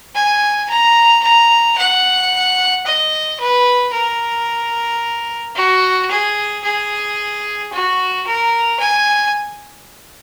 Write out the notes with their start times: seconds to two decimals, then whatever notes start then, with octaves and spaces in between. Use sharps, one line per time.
0.15 G#5
0.70 A#5
1.23 A#5
1.78 F#5
2.86 D#5
3.40 B4
3.94 A#4
5.56 F#4
6.11 G#4
6.64 G#4
7.73 F#4
8.27 A#4
8.80 G#5